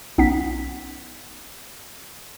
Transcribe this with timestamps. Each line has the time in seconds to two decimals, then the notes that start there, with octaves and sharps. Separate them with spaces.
0.18 B1 B3 C#4 D#4 F#5 B6